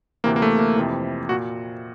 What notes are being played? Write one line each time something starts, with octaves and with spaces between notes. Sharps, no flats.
D2 C3 E3 A#3
A#3
A3
A#3
F2 C3 E3
A#2 F#4